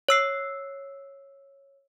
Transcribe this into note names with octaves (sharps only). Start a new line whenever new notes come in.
C#5 E6 C7